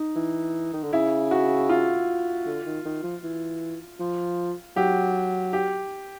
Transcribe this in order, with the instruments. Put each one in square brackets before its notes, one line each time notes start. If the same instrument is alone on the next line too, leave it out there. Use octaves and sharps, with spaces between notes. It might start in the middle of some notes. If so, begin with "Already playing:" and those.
Already playing: [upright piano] D#4
[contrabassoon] E3
D#3
D3
[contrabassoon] C#3 [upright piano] E4
[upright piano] F#4
F4
[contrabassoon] D3
D#3
D#3
F3
E3
F3
[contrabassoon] F#3 [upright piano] G4
[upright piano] G4